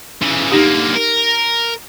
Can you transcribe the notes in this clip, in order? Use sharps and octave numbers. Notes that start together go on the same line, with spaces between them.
C#3 E3
D3 A#3 D#4 G4
A#4